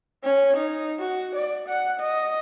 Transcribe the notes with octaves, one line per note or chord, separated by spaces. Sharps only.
C#4
D#4
F#4
D5
F#5
D#5